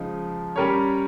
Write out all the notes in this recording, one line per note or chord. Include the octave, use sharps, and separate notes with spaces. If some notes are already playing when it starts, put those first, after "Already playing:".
Already playing: C#3 F3 G#3 D#4
G3 C#4 G4 A#4 C#5